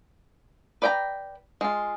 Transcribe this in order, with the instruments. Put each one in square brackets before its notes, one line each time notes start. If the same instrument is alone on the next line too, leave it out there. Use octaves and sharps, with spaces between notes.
[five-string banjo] B4 D5 G5 G#5 A#5
G#3 F4